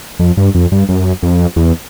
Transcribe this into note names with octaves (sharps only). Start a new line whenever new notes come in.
F2
G2
F2
G2
F#2
F2
E2